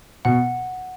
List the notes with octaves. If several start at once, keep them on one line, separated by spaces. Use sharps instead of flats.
B2 F#5